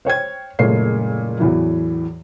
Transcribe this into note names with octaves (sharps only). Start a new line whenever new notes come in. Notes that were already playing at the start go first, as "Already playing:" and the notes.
C5 C#5 G5 G#6
F#1 A#2 G#3 A3 C#5 C7
E2 A2 E3 F#3